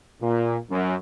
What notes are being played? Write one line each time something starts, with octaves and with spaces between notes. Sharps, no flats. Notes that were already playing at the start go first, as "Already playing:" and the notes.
A#2
F#2